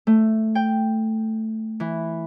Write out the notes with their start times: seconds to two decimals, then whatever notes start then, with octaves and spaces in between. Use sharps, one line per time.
0.07 A3
0.55 G5
1.80 E3